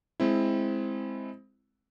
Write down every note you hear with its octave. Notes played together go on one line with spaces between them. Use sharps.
G#3 C4 E4